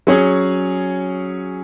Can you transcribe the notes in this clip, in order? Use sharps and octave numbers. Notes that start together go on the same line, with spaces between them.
F#3 C#4 G#4